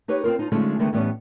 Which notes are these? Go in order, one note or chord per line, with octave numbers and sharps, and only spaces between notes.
D#4 G4 B4 C#5
C4 C#4 F4 A#4
D#4 F4
D3 F3 G#3 A3 C#4 D#4
D3 D#3 G#3 A3 B3
A2 E3 G3 B3 C#4 D5